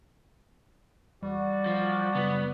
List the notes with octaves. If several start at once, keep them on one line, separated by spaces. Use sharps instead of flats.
E2 G3 F#4 D5
F3
F#2 C#3 B3